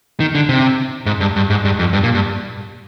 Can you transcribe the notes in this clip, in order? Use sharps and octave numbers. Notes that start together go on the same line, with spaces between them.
D#3
D3
C3
G#2
G2
G2
G#2
G2
F2
G2
A#2
G2